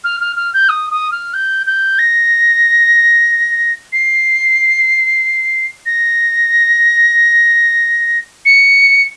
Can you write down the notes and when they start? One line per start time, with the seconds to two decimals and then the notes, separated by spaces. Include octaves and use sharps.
0.04 F6
0.21 F6
0.36 F6
0.54 G6
0.69 D#6
0.91 D#6
1.12 F6
1.34 G6
1.66 G6
1.98 A#6
3.92 C7
5.86 A#6
8.45 C#7